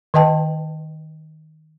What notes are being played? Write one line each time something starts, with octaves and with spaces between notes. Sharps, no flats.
D#3 B4 D#5 G5 A5